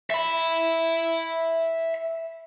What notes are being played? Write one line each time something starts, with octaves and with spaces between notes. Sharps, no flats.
E5 B5